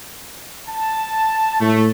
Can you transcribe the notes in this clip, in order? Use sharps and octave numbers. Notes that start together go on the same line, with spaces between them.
A5
A2 A3